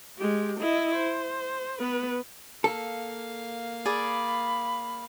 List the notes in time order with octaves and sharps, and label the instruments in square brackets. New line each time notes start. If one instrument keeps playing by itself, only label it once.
[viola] G#3 G4
E4 D#5
C5
B3 B4
[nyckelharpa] A#3 F5 [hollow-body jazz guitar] A4
[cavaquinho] G#4 D5 [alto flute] B5